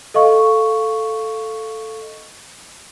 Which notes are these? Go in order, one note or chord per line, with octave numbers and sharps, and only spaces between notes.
A4 D#5 F5 C#6